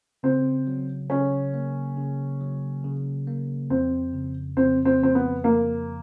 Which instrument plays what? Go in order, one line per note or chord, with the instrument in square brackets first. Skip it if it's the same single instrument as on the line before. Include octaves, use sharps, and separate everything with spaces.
[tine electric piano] C#3 [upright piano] C4
[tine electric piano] F#3
[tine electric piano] C#3 [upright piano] C#4
[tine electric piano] A#3
C#3
F#3
C#3
A#3
[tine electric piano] F2 [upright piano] C4
[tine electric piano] C#3
[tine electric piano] F2 [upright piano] C4
[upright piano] C4
[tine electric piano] F3 [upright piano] C4
[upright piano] B3
[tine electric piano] F2 [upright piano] A#3